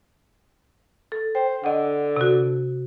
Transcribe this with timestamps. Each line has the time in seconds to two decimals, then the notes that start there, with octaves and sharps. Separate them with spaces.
1.12 A4
1.35 C5 G5
1.64 D3 D#5 F#5
2.17 C3 F#4